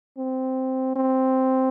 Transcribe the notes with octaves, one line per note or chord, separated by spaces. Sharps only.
C4
C4